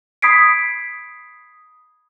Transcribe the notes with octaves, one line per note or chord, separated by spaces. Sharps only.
B5 D#6 G#6 B6 C7 D7